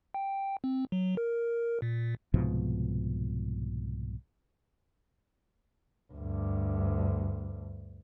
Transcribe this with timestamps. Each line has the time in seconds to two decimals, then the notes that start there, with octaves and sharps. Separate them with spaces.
0.14 G5
0.64 C4
0.92 F#3
1.17 A#4
1.82 A#2
2.34 C2 G#2 B2 F3
6.13 D2 G2